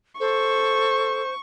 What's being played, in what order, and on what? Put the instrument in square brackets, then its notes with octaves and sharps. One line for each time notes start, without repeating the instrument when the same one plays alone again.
[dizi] A4 [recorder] C5 [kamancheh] C#6